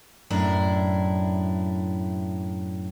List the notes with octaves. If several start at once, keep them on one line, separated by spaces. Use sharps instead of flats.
F#2 A2 D4 E4